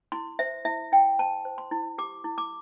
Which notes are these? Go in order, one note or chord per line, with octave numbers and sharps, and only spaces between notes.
E4 C6
C5 E5
E4 E5
E4 G5
C5 A5
C5
C6
E4
G4 D6
E4
D6